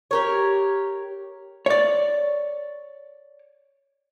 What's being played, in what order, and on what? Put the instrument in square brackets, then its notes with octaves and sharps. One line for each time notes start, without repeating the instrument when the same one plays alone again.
[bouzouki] G4 A#4 C#5
[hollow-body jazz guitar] C#5 D5